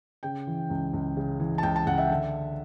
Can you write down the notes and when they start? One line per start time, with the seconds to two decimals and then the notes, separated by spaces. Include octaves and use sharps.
0.23 C#3 G5
0.47 E3
0.70 C#2
0.93 C#2
1.17 C#3
1.40 E3
1.58 A5
1.63 C#2 G5
1.76 A5
1.86 C#2 F#5
1.98 E5
2.10 D3